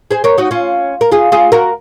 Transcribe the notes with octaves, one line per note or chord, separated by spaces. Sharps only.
G#4 C5
A#4 C#5
D#4 F#4
C#4 F4
A#4
F4 G#4
F4 G#4
F#4 A#4